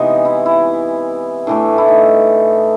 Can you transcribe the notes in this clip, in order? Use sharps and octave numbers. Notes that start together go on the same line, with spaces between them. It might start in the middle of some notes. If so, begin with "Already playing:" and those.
Already playing: C3 E3 G#3 B3 D#4
E4
E4
A2 E3 A3 D4
E4
D#4